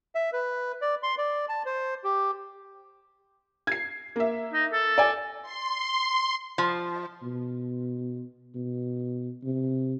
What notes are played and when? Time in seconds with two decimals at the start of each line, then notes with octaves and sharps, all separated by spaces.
0.15 E5
0.33 B4
0.81 D5
1.03 C6
1.18 D5
1.49 A5
1.66 C5
2.04 G4
3.67 G#6 C7
4.16 A#3 E5
4.53 D#4
4.73 A4
4.98 D5 G#5
5.42 C6
6.58 F3
7.23 B2
8.55 B2
9.44 C3